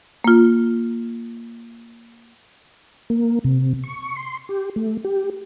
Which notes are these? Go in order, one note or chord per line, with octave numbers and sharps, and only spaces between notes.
A#3 F4
A#3
C3
C#6
C6
G4
A3
G4